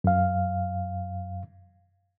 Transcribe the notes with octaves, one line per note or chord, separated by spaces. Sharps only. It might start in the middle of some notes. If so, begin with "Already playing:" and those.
F#2 F5